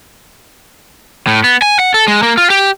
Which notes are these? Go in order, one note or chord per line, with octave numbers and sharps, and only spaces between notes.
A2
B3
G#5
F#5
A4
G#3
A#3
F4
G4